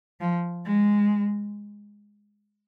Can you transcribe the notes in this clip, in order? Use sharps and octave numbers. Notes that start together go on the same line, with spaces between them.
F3
G#3